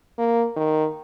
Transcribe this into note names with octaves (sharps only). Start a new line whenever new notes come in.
A#3
D#3